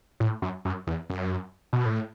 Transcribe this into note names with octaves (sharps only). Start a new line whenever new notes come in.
A2
F#2
F#2
E2
F#2
B2
A2